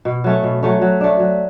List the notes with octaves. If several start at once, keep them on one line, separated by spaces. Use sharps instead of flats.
B2
F#3 A3 C#4
B2
F#3 A3 C#4
F#3
A3 D4
F#3